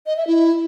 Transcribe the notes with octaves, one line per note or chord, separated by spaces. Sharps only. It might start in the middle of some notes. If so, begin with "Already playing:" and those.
D#5
E5
E4